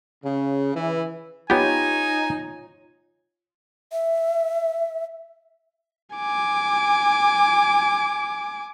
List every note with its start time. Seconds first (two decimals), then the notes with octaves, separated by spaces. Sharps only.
0.25 C#3
0.75 E3
1.50 B3 D#4 F4 G4 C#5 G#5
3.92 E5
6.16 G#5 D6